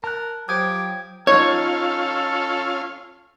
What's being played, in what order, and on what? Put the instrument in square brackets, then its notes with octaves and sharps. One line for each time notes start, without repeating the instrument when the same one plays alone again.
[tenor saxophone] A#4 [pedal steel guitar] A5 F#6
[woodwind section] F3 F#3 [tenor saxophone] G4 [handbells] G5 G6 G#6 [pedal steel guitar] D#6
[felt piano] F3 D#4 [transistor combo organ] C#4 F4 F5 [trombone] A4 [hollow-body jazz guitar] C#5